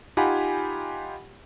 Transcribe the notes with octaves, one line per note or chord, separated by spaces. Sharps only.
D#4 F4 G4 F#5 G#5 B5